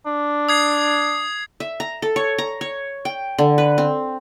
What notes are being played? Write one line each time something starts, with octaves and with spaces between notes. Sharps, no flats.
D4
D#6 G#6 C7
E5
A#5
A4
C#5
A#5
C#5
G5
D3
B4
C4